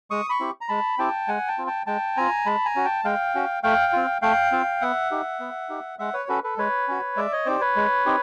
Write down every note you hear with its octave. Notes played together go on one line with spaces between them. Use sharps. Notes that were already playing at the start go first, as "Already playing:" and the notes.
G#3 C#6 D#6
B5 C#6
C4 E4 G4
A#5
G#3 A5 B5
C4 E4 G4 G5 A5
G#3 F#5 G#5
G5 A5
C4 F4
G5 A5
G#3 G5 A5
C4 F4 G#5 A#5
G#3 A5 B5
G#5 A#5
C#4 F#4
G5 A5
G#3 F5 G5
C#4 F#4
A3 F5 G5
C4 F4
A3 F5 G5
C4 F4
B3 E5 F#5
D#4 G4
B3
D#4 G4
G#3 E5 F#5
B4 C#5
C#4 F#4 A4 B4
A4 B4
G#3 B4 C#5
C#4 F#4
G#3 D5 E5
C#5 D#5
C4 D#4 G4 C5 D5
B4 C#5
G#3
C4 D#4 G4